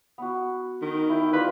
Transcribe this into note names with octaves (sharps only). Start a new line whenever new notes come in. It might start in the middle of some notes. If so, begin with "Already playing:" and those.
B3 F#4
D#3
E4 G5
G3 F4 B4